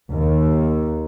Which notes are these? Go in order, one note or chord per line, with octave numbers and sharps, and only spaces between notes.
D#2